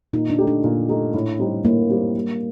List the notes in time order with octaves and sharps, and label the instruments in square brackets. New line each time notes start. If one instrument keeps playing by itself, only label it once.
[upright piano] A#2 [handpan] D#4
[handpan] D4
[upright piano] A3 D#4 G4
[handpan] D4
[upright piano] A#2
A3 D#4 G4
A2
G3 C4 D#4 G4
[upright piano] A2 [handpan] A#3
[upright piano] G3 C4 D#4 G4
G3